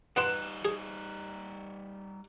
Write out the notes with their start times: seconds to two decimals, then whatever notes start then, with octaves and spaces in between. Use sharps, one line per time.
0.16 G3 B3 D#4 G5 C6 F#6 E7
0.65 G#4